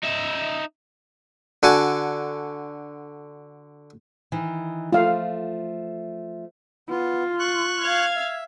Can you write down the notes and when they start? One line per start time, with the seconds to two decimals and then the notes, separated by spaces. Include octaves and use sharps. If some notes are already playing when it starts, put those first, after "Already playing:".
0.03 D#4 E5
1.63 D3 F#4 G#5 A5
4.32 D#3 E3
4.93 F3 A3 F4 F5
6.90 B3 F4
7.39 C#6 F#6
7.80 F5 F6 G#6
8.16 E5